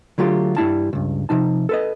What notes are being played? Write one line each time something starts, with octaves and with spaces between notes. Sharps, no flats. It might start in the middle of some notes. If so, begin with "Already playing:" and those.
D3 F#3 A3 F4 G4
G2 G3 E4 A5
C#2 G2
C3 F3 D#4 A5
A4 B4 D#5